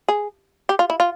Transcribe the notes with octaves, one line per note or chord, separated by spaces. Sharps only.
G#4
G4
F4
E4
F4